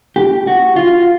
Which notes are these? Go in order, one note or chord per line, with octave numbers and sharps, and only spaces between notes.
G4
F#4
F4